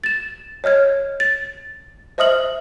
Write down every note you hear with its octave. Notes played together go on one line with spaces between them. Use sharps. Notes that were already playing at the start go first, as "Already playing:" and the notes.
A6 E7
C#5 D#5 F6 G#6
A6
C5 D#5 E5 D#6 F6 F#7